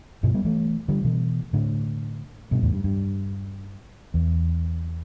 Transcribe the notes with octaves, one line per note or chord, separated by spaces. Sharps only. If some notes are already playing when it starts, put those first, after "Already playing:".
G2 B2
G3 B3
E3 A3
D3 G3
B2 E3
A2 D3
G2 B2
E2 A2
G2
G2
E2